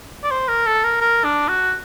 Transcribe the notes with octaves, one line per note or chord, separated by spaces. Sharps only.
D5
C5
A#4
A4
A#4
A#4
D4
F#4